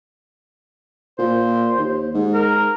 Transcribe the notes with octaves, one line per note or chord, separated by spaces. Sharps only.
A#2 C5
D#2
G#2
A#4